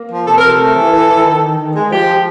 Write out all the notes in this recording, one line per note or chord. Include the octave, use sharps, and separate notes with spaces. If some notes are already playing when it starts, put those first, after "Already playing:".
Already playing: A#3
F3
C3 A4
C3 A#4
A4
A3
E3
E3
E3
D#3
D#3
D#3
G#3
F3 G4
F3